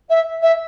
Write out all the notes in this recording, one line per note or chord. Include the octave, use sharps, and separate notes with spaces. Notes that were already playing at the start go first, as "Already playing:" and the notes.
E5
E5